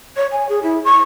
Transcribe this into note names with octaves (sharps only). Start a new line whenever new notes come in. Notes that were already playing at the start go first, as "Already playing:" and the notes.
C#5
G#5
G#4
E4
C#6